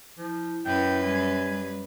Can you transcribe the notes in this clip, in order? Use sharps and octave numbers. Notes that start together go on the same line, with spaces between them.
F3 E4
F#2 B4 G5
G3 G#5